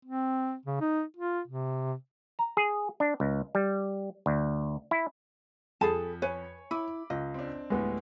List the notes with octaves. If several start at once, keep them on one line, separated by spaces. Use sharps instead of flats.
C4
C#3
D#4
F4
C3
A#5
G#4
D4
C#2
G3
D2
E4
F2 G#4 A4 A5 B5
B4 C#5 G#5
E4 B5 D6
C#2 D#5
C4 D4
D2 A2 G3 G#3 B3